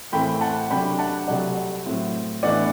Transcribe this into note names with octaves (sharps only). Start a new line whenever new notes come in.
A2 E3 A3 C4 G5 B5
F#5 A5
C3 F#3 A3 D4 G5 B5
F#5 A5
C2 C3 F#3 A3 D5 F#5
A2 F#3 C4 E4
A2 E3 B3 D4 D5 F#5